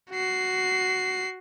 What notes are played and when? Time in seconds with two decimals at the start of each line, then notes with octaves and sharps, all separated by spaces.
0.11 F#4 C7